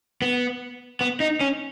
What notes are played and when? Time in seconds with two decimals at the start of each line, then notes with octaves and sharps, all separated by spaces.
0.22 B3
1.01 B3
1.20 D#4
1.41 C#4